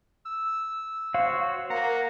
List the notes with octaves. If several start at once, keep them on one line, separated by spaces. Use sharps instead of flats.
E6
F#4 C5 C#5 F5
A#3 F#5 A#5